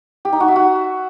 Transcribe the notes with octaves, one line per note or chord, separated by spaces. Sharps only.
G4
D#4
F#4
E5
F#4